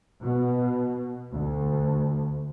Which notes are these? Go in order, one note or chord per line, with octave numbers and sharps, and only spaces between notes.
B2
D2